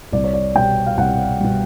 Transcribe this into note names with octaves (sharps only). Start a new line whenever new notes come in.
C2 D5
C#5
D5
B2 G3 G5
F5
C2 F#5
B2 G3